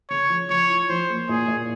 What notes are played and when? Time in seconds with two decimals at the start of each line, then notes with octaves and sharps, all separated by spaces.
0.10 C#3 C#5
0.29 F3
0.50 F3 C#5
0.70 F4
0.89 F3 C5
1.09 A#3
1.29 A#2 G#4
1.48 A#2